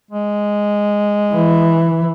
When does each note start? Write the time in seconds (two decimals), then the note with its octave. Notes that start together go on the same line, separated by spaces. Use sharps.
0.11 G#3
1.34 E3